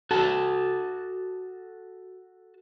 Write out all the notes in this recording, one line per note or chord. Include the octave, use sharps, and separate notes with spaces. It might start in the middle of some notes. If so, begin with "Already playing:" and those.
F#4 A4 A5